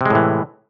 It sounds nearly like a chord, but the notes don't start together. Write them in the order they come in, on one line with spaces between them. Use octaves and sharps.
C3 G#3 A2 E3